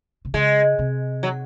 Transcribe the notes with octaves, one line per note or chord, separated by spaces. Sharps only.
C3
C#3 G#3
C3
F#3